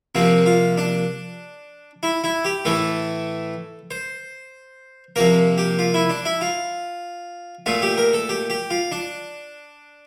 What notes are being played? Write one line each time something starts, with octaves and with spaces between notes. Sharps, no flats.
C3 F3 A#3 C4
F4
D4
E4
E4
G4
A2 E3 A3 A4
C5
C3 F3 A#3 A#4
G4
F4
E4
D4
E4
F4
A#2 A3 F4
G4
A#4
A4
G4
G4
F4
D4